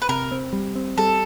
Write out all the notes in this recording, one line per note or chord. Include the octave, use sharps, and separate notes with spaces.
B4
C3 A#4
C4
G3
C4
G3 A4